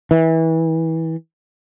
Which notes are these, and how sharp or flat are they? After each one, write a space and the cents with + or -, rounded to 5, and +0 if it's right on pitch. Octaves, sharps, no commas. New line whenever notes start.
E3 -25